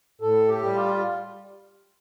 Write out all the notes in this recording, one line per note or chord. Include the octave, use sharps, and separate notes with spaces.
A2 A4
G4
G3
F4